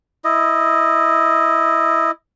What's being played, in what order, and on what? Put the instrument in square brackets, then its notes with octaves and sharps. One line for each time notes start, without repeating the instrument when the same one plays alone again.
[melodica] E4 D#5